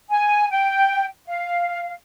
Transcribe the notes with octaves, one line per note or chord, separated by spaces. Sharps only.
G#5
G5
F5